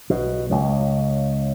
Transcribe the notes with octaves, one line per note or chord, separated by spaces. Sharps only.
B1 B2
C#2 C#3